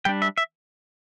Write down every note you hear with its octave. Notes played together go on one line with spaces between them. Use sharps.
G3 D4 G5
E5
E5